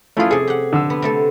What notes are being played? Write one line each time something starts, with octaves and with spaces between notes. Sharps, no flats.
A3 C#4 E4 F4 G#4
C3 G#4 A4
G4 F#5
D3 E6
B3
C3 A3 A4